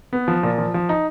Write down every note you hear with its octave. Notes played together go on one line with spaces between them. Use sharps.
B3
F3
A#2
F3
F3
D#4